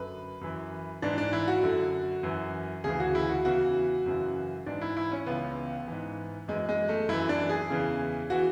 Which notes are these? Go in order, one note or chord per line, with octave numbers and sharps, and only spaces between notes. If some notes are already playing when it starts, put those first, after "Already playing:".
Already playing: F#2 D3 B4
F#2 E3
G#2 E3 D4
D4
E4
F#4
F#2 D3
F#2 E3
D2 C#3 E3 G#4
F#4
E4
F#4
E2 C#3 E3 F#4
F#2 C#3 E3
G#2 E3 D4
E4
E4
C#4
C#2 C#3 E3 B3
G#2 E3
F#2 E3 G#3
G#3
A3
F#2 E3 E4
D4
G#4
E2 C#3 E3
E3 F#4